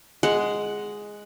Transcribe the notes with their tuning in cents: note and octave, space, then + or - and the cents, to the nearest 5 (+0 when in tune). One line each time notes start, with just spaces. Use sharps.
G#3 +0 F#5 +0